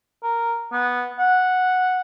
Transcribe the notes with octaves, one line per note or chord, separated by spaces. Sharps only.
A#4
B3
F#5